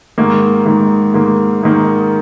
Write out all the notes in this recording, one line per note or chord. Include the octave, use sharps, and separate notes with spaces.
G#2 D#3 A#3
G#2 D#3 A#3
G#2 D#3 A#3
G#2 D#3 A#3